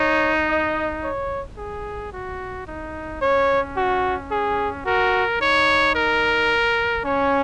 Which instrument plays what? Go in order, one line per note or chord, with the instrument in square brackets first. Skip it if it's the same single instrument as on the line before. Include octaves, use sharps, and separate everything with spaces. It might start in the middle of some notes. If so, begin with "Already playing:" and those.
Already playing: [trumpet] D#4 [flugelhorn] C#5
[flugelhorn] D#5
C#5
[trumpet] G#4
F#4
D#4
[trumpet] C#4 [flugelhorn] C#5
[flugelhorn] F#4
G#4
[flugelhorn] F#4 [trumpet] A#4
[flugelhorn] D#4 [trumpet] C#5
[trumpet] A#4
[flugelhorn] C#4 [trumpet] C#5